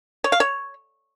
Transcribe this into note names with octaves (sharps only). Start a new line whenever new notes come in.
C#5
F5
C#5